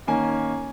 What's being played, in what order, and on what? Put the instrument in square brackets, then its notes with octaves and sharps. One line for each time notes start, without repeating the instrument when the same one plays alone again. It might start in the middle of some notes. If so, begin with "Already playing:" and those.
[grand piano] D#3 A#3 C#4 G#5